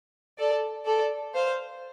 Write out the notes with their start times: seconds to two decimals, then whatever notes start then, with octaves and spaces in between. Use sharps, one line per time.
0.38 A4 D5
0.86 A4 D5
1.34 C5 F5